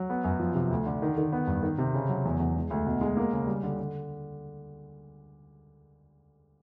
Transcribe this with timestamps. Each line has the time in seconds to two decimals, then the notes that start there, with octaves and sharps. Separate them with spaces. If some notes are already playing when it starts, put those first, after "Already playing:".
Already playing: F#3
0.10 B3
0.24 F#2
0.39 F3
0.55 C3
0.71 D2
0.86 D3
1.02 D#3
1.18 D#3
1.32 B3
1.47 G2
1.63 D#3
1.78 C3
1.94 C#3
2.09 F#3
2.25 E2
2.40 E2
2.56 G#3
2.70 D2
2.86 B2
3.01 G#3
3.17 A#3
3.33 C#3
3.47 G3
3.63 D3
3.79 D3